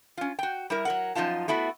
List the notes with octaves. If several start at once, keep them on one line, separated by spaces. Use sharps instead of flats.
C#4 F4
F#4 G5
G3 E4 A#4
F#3 A#4 F#5
F#2 F3 D#4 F4 A5
A3 B3 E4 F#4